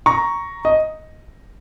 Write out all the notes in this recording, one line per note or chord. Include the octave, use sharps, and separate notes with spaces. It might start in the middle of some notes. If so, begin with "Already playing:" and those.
A#5 C#6
D#5